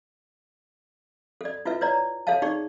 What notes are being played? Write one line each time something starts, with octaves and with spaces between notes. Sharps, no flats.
A4 D5
E4 F4 A4 B4 E5
B4 C#5 D5 A#5
A4 C#5 E5 F5 A5
D#4 G#4 D5 C#6